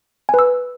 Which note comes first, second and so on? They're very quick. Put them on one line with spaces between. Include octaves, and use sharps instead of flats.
G#5 B4 E6